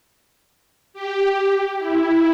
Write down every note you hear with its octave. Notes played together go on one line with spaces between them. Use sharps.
G4
E4